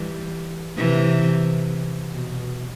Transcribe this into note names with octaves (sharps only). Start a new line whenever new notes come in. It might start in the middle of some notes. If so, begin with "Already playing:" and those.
Already playing: E3 G3
C3 E3
B2